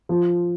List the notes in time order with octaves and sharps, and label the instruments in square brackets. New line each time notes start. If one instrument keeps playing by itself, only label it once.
[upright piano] F3